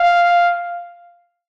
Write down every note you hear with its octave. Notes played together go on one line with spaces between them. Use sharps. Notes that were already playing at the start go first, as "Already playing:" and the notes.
Already playing: F5